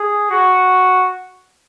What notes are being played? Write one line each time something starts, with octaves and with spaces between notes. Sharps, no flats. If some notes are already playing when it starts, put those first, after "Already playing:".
Already playing: G#4
F#4